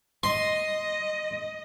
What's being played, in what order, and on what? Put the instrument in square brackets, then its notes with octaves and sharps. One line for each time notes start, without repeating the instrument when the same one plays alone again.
[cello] D#5 [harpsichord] C6